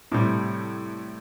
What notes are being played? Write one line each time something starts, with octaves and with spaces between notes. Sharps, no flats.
A2 C3 G3